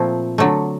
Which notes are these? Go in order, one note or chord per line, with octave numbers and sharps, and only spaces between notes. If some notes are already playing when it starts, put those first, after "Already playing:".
Already playing: A#2 F3 A3 C4
D3 F#3 A3